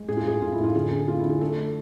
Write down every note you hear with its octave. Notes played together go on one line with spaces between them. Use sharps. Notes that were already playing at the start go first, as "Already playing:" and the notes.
Already playing: G#3
A2 G#4
F4
A2 G#4
A2 F4
E4
A2
F4
D3 G#4
D3 G#4
A3 F4
E4
D3
G#4
A3 A4
A3